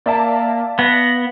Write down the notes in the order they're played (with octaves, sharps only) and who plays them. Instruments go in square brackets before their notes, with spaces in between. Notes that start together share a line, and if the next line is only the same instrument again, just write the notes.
[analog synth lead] A#3 [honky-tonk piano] D5 E5 A5 [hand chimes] F5
[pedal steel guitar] B3 [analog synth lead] A#6